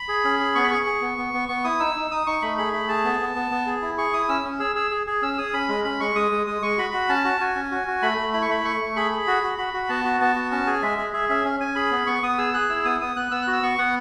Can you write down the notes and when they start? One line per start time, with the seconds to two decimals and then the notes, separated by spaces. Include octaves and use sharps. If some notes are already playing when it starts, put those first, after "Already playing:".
Already playing: B5
0.08 G#4
0.24 C#4
0.40 G#4
0.55 B3 C#6
0.64 B5
0.71 G#4 C#6
0.86 G#4
1.02 B3
1.18 B3
1.33 B3
1.49 B3 C#6
1.64 E4 D#6
1.80 D#4 E6
1.95 D#4
2.11 D#4 D#6
2.27 D#4 C#6
2.42 A3 B5
2.58 G#4 B5
2.73 A3 B5
2.88 G#4 A5
3.04 B3
3.20 B3
3.35 B3
3.51 B3
3.66 G#4
3.82 E4
3.98 G#4 C#6
4.13 E4 D#6
4.29 C#4 E6
4.44 C#4
4.59 G#4 E6
4.75 G#4 E6
4.91 G#4
5.07 G#4
5.22 C#4 E6
5.34 E6
5.38 G#4 D#6
5.53 C#4 B5
5.69 G#3
5.84 C#4 B5
6.00 G#3 C#6
6.16 G#3 D#6
6.31 G#3
6.46 G#3 D#6
6.62 G#3 C#6
6.78 F#4 B5
6.93 F#4
7.09 C#4 A5
7.25 F#4
7.40 F#4 G#5
7.56 C#4
7.71 F#4
7.87 F#4
8.02 A3 B5
8.18 A3
8.34 E4 B5
8.42 C#6
8.49 A3 B5
8.64 A3 C#6
8.80 A3
8.96 G#4 B5
9.11 G#4
9.27 F#4
9.43 F#4
9.58 F#4 B5
9.74 F#4
9.89 B3 A5
10.05 F#4
10.20 B3 A5
10.36 F#4
10.51 C#4 A5
10.67 G#4 G#5
10.83 G#3 E5
10.98 G#4
11.13 G#4 E5
11.29 C#4 E5
11.45 C#4
11.60 C#4 G#5
11.76 G#4 B5
11.91 B3
12.07 B3 C#6
12.22 B3 D#6
12.38 G#4 E6
12.54 G#4 F#6
12.69 E4 E6
12.85 B3 D#6
13.01 B3 D#6
13.16 B3 F#6
13.31 B3 E6
13.42 F#6
13.47 F#4
13.53 E6
13.63 B3 C#6
13.78 B3 F#5